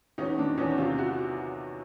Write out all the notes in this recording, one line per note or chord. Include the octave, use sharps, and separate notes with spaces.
E2 C#4 D#4
D#3 D4
E2 C#4 D#4
C3 D#4 F4
E4 F#4